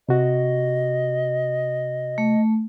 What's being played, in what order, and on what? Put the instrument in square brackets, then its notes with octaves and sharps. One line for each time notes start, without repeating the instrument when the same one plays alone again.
[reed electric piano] C3 F#4 [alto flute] D#5
[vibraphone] A3